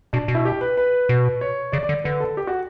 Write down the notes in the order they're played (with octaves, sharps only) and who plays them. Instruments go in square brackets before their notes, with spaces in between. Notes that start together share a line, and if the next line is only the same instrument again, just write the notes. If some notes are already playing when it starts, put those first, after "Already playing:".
[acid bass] B2 [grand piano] D4
[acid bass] B2
[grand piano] E4
G4
B4
B4
[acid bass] B2
[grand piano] C#5
[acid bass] C#3 [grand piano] D5
[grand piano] D5
[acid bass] D3
[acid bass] D3 [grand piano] B4
[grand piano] A4
G4
F#4